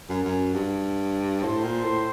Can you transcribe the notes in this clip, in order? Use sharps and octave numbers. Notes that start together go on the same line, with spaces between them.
F#2
F#2
G2
A2 C5
A#2
A2